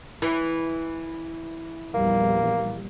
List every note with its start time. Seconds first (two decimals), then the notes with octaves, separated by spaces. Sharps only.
0.22 E3
1.94 A#1 E2 G3 A#3